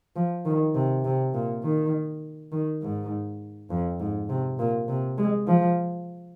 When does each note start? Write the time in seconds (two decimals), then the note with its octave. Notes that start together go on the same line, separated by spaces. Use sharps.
0.16 F3
0.45 D#3
0.75 C3
1.05 C3
1.34 A#2
1.64 D#3
2.52 D#3
2.82 G#2
3.70 F2
4.00 G#2
4.29 C3
4.59 A#2
4.89 C3
5.18 G#3
5.47 F3